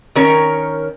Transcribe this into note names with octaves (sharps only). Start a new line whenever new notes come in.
D#3 C#4 A#4 C#5